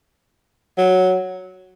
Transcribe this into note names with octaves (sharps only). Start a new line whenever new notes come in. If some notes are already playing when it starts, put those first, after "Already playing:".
F#3